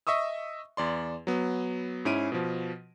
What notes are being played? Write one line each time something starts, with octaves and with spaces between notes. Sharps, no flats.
D#5 E5 C#6 D#6 E6
E2 D5 C6
F#3 B3
G#2 C#4 E4 D7 D#7
B2 F3